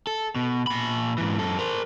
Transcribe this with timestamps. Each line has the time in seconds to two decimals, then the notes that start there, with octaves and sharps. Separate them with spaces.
0.07 A4
0.36 B2
0.67 A#2 B5
1.18 G#2 E3
1.39 F#2 A4
1.59 A#4 C5